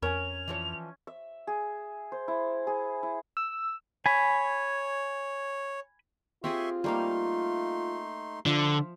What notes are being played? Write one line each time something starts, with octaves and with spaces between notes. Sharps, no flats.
F2 C#4 A#4 G#5 F7
E3 F3 C#5
E5
G#4
C5
E4
G#4
E4
E6
C#5 G#5 B5
C4 F4 G4 G#4 E5 C6 C#6
G3 A3 A#3 D#4 F5 C6
D3 F3 E5 F5